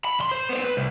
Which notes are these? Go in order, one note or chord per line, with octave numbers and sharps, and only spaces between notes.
B5
D2 C6
C5
B3 C5
B4
C2